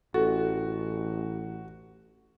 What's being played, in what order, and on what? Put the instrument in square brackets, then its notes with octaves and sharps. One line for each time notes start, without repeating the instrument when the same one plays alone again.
[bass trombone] A1 [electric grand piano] F#4 [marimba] A4